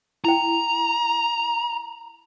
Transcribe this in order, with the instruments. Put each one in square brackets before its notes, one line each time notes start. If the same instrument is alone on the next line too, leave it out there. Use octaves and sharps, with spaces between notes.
[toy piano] E4 G5 [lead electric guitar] A#5